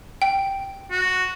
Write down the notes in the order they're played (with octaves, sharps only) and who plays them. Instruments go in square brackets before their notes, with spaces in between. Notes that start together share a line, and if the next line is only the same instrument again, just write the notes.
[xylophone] G5
[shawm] F#4